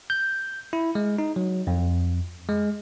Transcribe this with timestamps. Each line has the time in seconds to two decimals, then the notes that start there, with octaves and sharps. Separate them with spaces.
0.10 G6
0.73 E4
0.95 G#3
1.18 D#4
1.36 F#3
1.67 F2
2.49 G#3